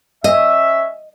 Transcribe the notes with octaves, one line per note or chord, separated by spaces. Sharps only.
C#4 D#5 E5